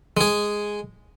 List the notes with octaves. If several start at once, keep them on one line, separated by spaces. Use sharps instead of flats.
G#3 G#4